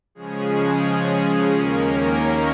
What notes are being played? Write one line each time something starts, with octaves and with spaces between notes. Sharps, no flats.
C#3 F3 G#3 C#4 G#4
G#4
D#2 D#3 A#3 C#4 A#4
A#4
C#5